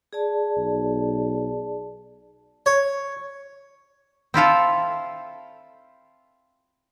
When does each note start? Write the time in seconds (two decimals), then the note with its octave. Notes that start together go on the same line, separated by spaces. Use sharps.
0.13 G#4 D5 A5
0.57 B1
2.66 C#5
4.34 C4 E4 F4 A4